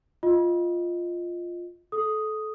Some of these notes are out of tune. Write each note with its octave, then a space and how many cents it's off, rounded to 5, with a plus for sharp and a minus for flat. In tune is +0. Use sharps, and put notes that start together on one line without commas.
F4 +0 D#5 +0
A4 -25 D#6 +0